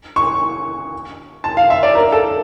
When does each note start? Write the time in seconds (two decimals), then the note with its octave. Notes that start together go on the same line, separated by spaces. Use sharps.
0.16 C#6
1.44 A5
1.57 F5
1.70 E5
1.83 D5
1.95 A#4
2.12 A4